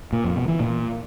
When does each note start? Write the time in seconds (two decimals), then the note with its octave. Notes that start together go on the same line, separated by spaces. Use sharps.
0.13 A#2
0.24 F2
0.36 B2
0.48 E3
0.60 A#2